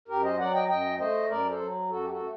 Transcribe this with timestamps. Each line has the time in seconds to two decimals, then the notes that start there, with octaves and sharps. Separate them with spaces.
0.08 F#2 G4 A#4
0.23 C5 D#5
0.39 F#3 D5 F#5
0.53 D#5 G5
0.68 F#2 D#5 G5
0.98 A3 C5 D#5
1.29 F#2 A#4 D5
1.49 A4 C5
1.60 F#3
1.89 F#2 F#4 A4
2.02 G4
2.10 F#4 A4
2.20 A3